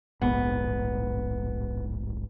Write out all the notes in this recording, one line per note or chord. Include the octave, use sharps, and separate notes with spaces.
D1 A#1 G#2 B3